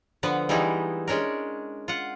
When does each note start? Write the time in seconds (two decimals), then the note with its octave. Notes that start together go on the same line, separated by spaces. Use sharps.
0.23 D3 F3 B3 B4
0.49 E3 G3 G#3 B3 D#4 E4
1.08 G#3 C#4 D4 A#4
1.88 F4 F#5